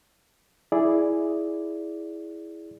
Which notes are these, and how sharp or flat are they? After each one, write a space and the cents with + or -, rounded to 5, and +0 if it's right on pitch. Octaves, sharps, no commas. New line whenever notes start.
E4 +0 G#4 +0 D5 -5